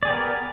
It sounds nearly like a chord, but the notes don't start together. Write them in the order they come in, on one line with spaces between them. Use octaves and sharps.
D5 G#4 G4 B3 A#4